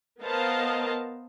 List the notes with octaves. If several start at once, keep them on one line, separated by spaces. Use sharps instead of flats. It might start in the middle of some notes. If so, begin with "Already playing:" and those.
B3 A#4 C5 D#5 F5 A5